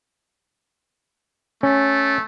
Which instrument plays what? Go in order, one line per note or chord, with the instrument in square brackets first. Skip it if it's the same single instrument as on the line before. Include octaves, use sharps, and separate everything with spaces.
[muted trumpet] A3 [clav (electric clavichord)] C#4